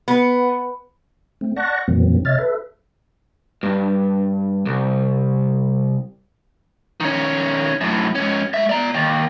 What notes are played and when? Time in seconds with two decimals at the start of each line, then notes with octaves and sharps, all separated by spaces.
0.08 B3
1.41 A3 C4
1.56 D5 F#5 A5 C#6 F#6 A#6
1.88 F2 A#2 E3 F#3 A#3 C4
2.25 C3 C#5 D#5 E5 F6 A6
2.38 A4 B4 E5
3.63 G2
4.66 C2
7.00 D#3 C#4
7.81 F#2 A2
8.15 G#2 C#4
8.54 G#3 E5
8.69 D5 A#5
8.94 D#2